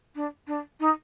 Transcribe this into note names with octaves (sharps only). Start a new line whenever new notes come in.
D4
D4
D#4